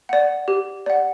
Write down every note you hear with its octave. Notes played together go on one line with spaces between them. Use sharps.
D5 F#5
G4
D5 F#5